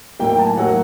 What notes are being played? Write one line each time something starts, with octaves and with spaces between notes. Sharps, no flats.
A2 F#3 A#3 G5
G5
A5
G#5
A2 F#3 A#3 F#5